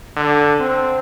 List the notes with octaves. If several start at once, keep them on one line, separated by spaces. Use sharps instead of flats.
D3
C4